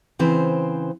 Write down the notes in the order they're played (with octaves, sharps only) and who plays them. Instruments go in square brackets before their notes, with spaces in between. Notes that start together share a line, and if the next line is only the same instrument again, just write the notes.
[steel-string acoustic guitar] C#3 E3 C4 C5